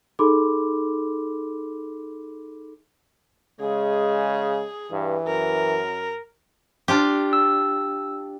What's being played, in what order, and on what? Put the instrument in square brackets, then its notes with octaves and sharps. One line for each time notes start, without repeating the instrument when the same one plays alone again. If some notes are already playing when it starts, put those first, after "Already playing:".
[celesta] D#4 G#4 A4 B5 C6 D6
[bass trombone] C#3 [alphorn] G#3 [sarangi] G#4
[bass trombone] G2 [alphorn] E3
[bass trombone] F#2 [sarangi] A#4
[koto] D4 F4 G4
[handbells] E6